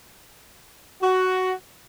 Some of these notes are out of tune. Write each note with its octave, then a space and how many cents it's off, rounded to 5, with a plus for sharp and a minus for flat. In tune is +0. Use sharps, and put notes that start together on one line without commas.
F#4 +10